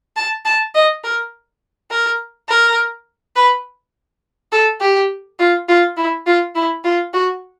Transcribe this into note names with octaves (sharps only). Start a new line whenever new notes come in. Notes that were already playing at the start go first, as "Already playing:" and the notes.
A5
A5
D#5
A#4
A#4
A#4
B4
A4
G4
F4
F4
E4
F4
E4
F4
F#4